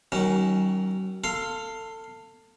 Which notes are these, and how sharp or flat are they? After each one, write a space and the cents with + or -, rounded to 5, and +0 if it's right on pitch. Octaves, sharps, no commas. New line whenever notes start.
D#3 +0 F#3 +40 C#4 +0
A4 +25 F5 +0 C6 +0